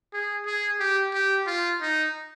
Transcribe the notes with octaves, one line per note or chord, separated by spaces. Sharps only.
G#4
G#4
G4
G4
F4
D#4